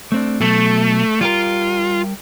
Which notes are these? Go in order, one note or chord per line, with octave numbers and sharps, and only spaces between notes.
A3 C4 D4
B2 F#3 A3 A4
G3 F4 G4 A#4